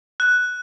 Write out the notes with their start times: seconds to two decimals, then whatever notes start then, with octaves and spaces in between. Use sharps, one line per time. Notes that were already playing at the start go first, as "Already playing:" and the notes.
0.20 F#6